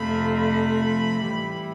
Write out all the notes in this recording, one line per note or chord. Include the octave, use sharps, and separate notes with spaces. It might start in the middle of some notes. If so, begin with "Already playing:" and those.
Already playing: F2 C3 F3 A3 B5
B5
A2 E3 G3